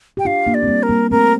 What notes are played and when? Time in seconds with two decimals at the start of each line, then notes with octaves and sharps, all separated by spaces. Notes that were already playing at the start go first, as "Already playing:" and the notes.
0.17 G4 G5
0.25 D4 F4 F5
0.47 A#3 D4
0.54 D5
0.63 C4
0.68 G3 A#3
0.83 A#4
0.89 G3 A#3
1.11 A3 C4 A#4